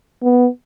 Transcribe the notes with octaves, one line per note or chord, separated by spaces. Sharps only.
B3